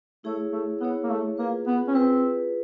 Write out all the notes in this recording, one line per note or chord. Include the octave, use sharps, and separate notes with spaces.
A3 E4 G#4 C#5
A3
B3 E4 G#4 C#5
A#3
A3
A#3 F4 G#4 B4
B3
C#4
C4 F4 G#4 B4